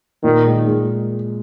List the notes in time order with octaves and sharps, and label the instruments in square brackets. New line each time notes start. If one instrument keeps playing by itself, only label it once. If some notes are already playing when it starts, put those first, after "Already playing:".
[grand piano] A#2 [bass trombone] D#3
[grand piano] G#3
G#3